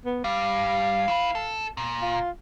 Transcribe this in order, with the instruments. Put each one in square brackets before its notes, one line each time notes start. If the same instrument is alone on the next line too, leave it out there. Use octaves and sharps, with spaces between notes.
[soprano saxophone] B3
[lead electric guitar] G2 G3 [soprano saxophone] F5
[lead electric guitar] E4 B4
A4
A#2
[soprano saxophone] F4